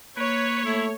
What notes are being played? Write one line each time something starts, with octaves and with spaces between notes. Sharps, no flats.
A#3 B4 C#5
A3 E4